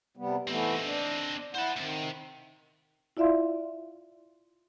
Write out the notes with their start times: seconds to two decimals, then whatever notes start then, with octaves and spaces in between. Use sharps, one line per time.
0.17 C3 G3 B3
0.47 E3 A3 B3 C4 D#4
0.82 D4
1.55 E4 C5 F#5 A5
1.76 D2 C3 D#3
3.17 E4 F4 D5 E5 F5 C6